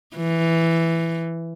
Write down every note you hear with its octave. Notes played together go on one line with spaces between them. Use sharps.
E3